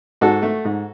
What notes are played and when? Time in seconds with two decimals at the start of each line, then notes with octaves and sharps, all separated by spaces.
0.21 G#2 F#4 A4
0.42 A3
0.65 G#2